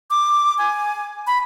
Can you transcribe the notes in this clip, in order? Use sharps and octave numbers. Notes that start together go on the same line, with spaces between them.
D6
G#5
B5